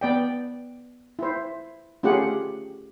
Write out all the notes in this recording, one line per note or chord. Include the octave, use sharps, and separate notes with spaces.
B3 D5 G5
E4 C5
A3 C#4 F4 G4 G#4 F#5